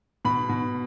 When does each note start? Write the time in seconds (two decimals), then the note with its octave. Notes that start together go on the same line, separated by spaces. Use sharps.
0.25 B2 B5
0.49 B2